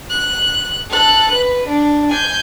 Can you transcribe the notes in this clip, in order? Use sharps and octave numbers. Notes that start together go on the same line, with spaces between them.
F#6
A4 F#6
B4
D4
G#5 G6